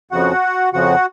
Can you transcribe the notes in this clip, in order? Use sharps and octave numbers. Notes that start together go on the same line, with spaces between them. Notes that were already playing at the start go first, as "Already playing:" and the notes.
F2 C#3 F3 F#4 F#5
F2 C#3 F3 F#4 F#5